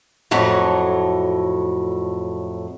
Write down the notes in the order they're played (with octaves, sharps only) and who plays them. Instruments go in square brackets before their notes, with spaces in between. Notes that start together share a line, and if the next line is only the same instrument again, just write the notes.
[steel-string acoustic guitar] F2 A2 F#3 A3